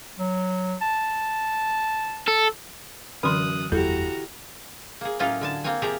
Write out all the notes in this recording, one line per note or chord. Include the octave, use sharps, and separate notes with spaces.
F#3
A5
A4
F#2 D3 E3 C6 D#6 F6 F#6
F#1 E2 G3 E4 F#4 G4 A4 A#5
A#3 G#4
A2 F#3 A#3 C#4 D#4 F4
D3 G#5 A5
A#3 C4 C#5 G#5
C3 F3 G4 G#4 A#4 A#5